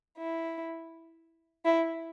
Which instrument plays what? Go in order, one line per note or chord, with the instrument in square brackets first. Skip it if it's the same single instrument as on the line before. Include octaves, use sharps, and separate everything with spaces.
[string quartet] E4
E4